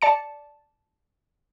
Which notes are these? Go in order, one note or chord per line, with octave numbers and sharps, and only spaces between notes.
D5 A5 C#7